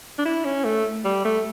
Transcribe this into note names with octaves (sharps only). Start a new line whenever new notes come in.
D4
E4
C#4
A3
G3
A3